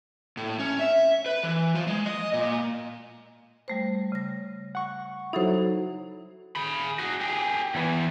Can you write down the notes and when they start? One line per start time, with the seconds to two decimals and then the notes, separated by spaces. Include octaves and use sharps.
0.37 A2
0.59 C#4
0.79 E5
1.26 B4
1.43 E3
1.75 F3
1.87 G#3
2.06 D#5
2.33 A#2
3.68 G3 A3 C5
4.12 C#3 A#6
4.75 F#5 C#6
5.33 F#3 D#4 E4 A4 C5
6.56 G#4 B5
6.99 F#4 G#4
7.21 G4 G#4
7.75 E2 E3